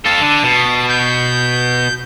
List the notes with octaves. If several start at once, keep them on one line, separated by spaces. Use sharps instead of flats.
F4 A4 A5
D3
B2
G6